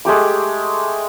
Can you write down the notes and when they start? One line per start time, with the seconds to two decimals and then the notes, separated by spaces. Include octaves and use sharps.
0.05 G#3 A3 G4 D6